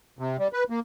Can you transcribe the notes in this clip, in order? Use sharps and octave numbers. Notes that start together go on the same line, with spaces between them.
C3
G3
B4
A#3